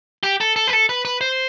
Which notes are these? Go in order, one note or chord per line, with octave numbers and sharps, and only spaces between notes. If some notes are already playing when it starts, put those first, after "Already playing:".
G4
A4
A4
B4
A4
B4
B4
C5